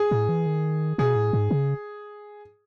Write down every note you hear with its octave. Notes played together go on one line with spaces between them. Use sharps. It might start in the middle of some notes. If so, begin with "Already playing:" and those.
Already playing: G#4
A2
E3
D#3
B2 G#4
A2
G#2
C#3